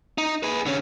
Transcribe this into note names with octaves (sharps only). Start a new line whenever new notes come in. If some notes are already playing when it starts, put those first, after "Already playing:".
D#4
G#4 B4
D3 C#4